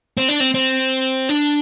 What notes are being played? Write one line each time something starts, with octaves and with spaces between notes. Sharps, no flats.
C4
D4
C4
C4
D4